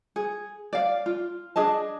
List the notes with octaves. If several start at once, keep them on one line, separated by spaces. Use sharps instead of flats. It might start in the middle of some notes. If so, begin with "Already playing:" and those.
G#4
D5 F5
F4
D4 G#4 D#5 A5